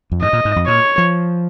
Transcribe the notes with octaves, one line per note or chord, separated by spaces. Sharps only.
F2
G#2 D#5
A#2
G#2
F2
A#2 C#5
F3